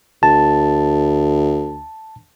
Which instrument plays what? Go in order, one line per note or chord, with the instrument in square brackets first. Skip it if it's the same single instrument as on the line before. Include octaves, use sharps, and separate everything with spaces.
[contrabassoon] D2 [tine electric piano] A5